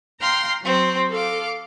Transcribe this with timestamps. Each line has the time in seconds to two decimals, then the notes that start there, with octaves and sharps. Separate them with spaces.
0.21 F5 G5 A#5 C6 F6
0.61 F#3 C4
1.10 A4 F5 D6